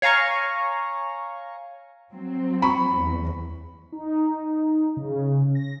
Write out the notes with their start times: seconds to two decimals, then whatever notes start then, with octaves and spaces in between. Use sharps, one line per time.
0.02 C#5 F5 G#5 A#5 C#6
2.13 F#3 C4
2.62 B5 C#6
2.97 E2
3.92 D#4
4.97 C#3
5.55 A#6